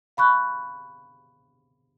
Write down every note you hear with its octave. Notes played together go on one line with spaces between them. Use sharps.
F5 B5 C#6 F#6